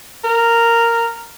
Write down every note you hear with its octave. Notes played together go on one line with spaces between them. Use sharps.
A#4